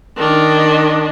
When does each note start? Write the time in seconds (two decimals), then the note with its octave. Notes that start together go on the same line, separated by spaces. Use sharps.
0.17 D#3 D4